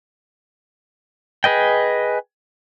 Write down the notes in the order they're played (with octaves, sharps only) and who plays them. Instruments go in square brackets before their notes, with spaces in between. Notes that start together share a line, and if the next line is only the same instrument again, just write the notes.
[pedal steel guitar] G#4 B4 D#5 G5